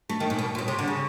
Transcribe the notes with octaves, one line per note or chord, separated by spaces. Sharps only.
A3
D#3
A#2
B2
A#2
B2
C3
D3
C#3